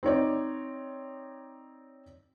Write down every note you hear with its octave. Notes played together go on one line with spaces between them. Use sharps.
C4 D#4 C#5 D5